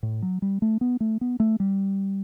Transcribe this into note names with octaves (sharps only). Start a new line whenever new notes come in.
A2
F#3
G3
A3
B3
A3
B3
A3
G3